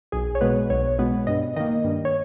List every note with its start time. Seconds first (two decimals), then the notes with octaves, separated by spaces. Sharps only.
0.12 B1 G#4
0.35 C#5
0.41 B2 G#3 B3 B4
0.70 B1 C#5
0.98 B2 G#3 B3
1.27 G2 D#5
1.56 D#3 A#3 D#5
1.84 G2
2.05 C#5